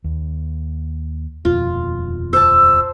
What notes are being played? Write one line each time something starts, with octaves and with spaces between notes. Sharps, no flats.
D#2
D#1 F2 B2 F4
C5 A5 E6